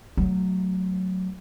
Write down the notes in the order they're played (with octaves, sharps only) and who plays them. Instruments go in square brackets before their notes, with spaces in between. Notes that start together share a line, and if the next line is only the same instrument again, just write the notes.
[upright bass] F#3 A3